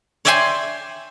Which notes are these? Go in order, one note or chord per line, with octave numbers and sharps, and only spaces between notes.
C#5 D5 E5 G5 G#5 C6